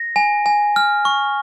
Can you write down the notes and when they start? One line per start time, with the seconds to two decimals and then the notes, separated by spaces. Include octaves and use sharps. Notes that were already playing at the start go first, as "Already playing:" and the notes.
Already playing: A#6
0.16 G#5
0.46 G#5
0.76 F6
1.05 C#6